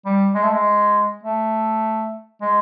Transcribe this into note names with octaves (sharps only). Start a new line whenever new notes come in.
G3
G#3
A3
G#3
A3
G#3